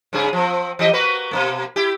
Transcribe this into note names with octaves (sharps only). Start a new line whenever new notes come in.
G2 C#3 G#4
F3 C4
E3 G4 D#5
A#3 F#4 B4
B2 D3 A#3
E4 G4